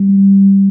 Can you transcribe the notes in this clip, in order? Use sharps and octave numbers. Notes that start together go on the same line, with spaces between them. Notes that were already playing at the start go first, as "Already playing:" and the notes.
Already playing: G3